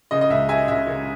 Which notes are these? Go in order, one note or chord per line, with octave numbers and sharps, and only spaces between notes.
C#3 D#5
D#5
C#2 E5
G#3 E5 G#5
C#2 E5
C#3